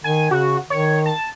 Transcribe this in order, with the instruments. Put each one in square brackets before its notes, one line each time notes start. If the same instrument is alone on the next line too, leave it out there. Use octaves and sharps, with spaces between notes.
[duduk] D#3 [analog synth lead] G#5
[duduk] C#3 [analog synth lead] F#4
[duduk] D#3 [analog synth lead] C#5
[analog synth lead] A5